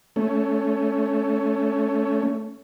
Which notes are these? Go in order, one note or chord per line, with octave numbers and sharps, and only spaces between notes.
A3 C#4